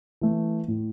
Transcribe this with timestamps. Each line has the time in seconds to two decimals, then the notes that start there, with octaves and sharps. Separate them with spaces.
0.21 E3 A3
0.68 A2